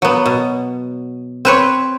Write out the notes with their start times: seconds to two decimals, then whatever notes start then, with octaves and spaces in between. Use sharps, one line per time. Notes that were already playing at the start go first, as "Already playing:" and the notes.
0.02 F#3 B3
0.26 B2
1.45 C4 B4 C#5